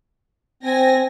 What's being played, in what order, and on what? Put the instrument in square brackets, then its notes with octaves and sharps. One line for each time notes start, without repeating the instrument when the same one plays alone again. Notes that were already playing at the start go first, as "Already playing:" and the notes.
[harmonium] C4 [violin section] G#5 A#6